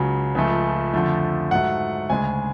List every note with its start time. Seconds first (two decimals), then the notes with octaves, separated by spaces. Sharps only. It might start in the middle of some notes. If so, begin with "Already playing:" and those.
Already playing: C#2 C#3 F#3
0.35 C#2 C#3 F3 A3
0.94 F2 D3 F3 A3
1.51 G#2 F#3 A3 F#5
2.10 D2 C#3 G#3 G#5